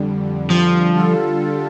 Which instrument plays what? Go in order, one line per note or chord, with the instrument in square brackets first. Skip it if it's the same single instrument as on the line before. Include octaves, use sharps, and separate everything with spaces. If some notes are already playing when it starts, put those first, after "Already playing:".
Already playing: [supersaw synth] F2 D3 G3
[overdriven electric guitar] F3
[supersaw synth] D3 G3 F4 A4